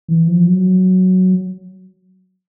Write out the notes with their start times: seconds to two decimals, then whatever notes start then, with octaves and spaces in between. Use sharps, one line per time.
0.08 E3
0.28 F3
0.46 F#3